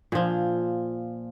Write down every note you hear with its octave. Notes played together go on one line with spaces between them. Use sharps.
A#2 F3